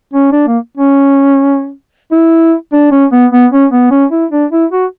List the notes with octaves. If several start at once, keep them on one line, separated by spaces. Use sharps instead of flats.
C#4
D4
A#3
C#4
E4
D4
C#4
B3
B3
C#4
B3
C#4
E4
D4
E4
F#4